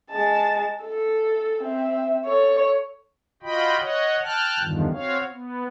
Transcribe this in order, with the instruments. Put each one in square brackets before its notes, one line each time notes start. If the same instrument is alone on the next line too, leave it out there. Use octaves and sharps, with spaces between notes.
[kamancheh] G#3 A5
A4
C4 E5
A4 C#5
[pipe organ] F4 F#4 D#5 G5 B5
C#5 D#5 F#5
G5 A5 F6 F#6
E2 G2 D3 D#3 F3
C4 F#4 C#5 F5
B3